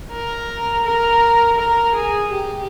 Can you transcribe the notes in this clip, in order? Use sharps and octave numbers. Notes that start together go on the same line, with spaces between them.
A#4
A#4
A#4
G#4
G4